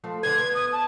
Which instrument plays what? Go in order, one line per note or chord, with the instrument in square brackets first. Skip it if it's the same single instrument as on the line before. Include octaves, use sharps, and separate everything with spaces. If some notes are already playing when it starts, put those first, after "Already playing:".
[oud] F3 A3 C4
[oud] D3 B4 C5 [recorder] G#6
[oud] B3
[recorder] D#6
A5